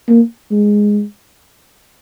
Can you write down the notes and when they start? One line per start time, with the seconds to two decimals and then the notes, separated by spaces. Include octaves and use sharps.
0.09 A#3
0.51 G#3